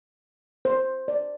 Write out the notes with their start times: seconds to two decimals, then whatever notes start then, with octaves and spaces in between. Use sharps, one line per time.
0.65 C5
1.08 D5